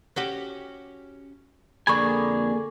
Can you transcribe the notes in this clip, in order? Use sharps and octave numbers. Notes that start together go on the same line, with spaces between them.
C#4 F#4 G4
F2 D3 A#3 D4 G#4 G#5 B5 C#6